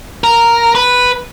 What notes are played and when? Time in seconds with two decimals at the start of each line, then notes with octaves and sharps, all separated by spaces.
0.24 A#4
0.75 B4